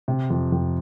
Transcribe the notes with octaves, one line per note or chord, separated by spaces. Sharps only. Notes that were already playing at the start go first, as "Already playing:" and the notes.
C3
F2
F2